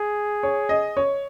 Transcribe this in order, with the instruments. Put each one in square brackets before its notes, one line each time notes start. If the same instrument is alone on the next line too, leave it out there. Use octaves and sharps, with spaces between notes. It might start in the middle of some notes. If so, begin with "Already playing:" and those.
Already playing: [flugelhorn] G#4
[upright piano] C#5
D#5
C#5